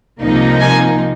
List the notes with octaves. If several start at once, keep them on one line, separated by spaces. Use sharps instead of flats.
C2 C3 F3 A#3 D#4
G#5